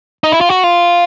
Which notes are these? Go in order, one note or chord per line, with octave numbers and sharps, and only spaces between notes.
D#4
E4
F4
F#4
F4